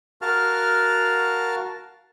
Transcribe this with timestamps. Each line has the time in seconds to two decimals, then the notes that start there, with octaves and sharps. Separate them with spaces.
0.22 F#4 A#4 F5 A5 F6